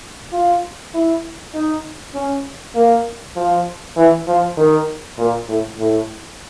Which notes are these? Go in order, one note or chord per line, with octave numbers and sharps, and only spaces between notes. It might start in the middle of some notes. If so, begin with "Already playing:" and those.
F4
E4
D#4
C#4
A#3
F3
E3
F3
D#3
A#2
A2
A2